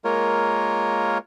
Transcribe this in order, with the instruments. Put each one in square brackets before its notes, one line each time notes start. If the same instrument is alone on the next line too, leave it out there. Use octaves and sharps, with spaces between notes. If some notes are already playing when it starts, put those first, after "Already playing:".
[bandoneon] G#3 A#3 F4 A#4 C#5